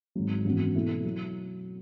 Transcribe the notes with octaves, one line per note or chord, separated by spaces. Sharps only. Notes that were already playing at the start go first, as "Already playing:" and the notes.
G#1 G#2 F#3
G#1 F#2 E3 B3 F#4
B2 A3 E4
F#3